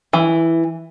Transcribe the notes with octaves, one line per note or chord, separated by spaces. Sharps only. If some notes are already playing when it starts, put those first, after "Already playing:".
E3